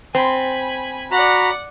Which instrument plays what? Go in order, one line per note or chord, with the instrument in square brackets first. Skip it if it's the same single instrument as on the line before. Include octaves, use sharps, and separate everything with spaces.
[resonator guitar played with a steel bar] C4 [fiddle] G#5 B5
[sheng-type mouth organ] F#4 A#5 B5 [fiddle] D5 F#5